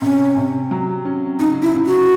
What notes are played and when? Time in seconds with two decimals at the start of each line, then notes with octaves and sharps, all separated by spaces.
0.02 C3 C#4
0.37 C3
0.71 F#3
1.05 C#4
1.39 C#3 D#4
1.62 E4
1.74 C#3
1.86 F#4